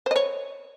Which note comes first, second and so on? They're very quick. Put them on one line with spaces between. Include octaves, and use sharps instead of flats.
C5 D#5 C#5